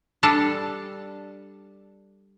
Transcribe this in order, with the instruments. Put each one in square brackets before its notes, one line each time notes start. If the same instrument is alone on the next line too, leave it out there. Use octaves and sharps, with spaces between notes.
[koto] G3 D4 A4 A5